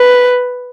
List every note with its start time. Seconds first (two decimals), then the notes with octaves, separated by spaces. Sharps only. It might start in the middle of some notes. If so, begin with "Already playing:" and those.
Already playing: B4